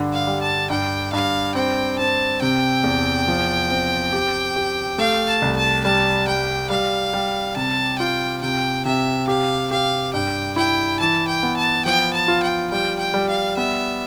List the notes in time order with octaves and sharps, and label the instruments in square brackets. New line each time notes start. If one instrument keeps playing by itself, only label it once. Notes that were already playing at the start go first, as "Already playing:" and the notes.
Already playing: [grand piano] G2 D3
[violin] F5
[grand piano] G3
[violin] A5
[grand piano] G2 [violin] G5
[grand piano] G2 [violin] F5
[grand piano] C4 [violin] G5
[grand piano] C4 [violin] A5
[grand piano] C3 [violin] G5
[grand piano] E2
F3
C4
G4
G4
[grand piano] A3 [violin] F5
[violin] A5
[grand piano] C2
[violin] A5
[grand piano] G3 [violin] A5
[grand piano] G3 [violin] G5
[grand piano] G3 [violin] F5
[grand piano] G3
[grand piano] C3 [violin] A5
[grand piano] F4 [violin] G5
[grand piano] C3 [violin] G5
[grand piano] C3 [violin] E5
[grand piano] G4 [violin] F5
[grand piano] G4 [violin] F5
[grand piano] G2 [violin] G5
[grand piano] E4 [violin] G5
[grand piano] E3 [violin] A5
[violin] G5
[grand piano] B3
[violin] A5
[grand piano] F3 [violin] G5
[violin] A5
[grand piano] F4
[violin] G5
[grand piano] G3 [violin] G5
[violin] G5
[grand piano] G3
[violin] F5
[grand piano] B3 [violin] E5